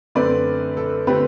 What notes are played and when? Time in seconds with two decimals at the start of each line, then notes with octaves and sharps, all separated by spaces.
0.15 F#2 D3 A3 C4 B4 D5
0.77 A4
1.07 D3 A3 C4 G4 B4